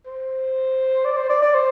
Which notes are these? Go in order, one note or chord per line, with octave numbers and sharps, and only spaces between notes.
C5
D5
C5
D5
D5
C5